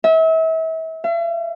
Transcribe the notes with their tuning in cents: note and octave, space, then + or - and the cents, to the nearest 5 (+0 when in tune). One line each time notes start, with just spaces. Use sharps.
E5 -35
E5 +45